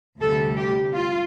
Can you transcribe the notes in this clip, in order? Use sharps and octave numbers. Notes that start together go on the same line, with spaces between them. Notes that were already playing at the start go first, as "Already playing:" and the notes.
D2 C3 G3 A4
G4
F4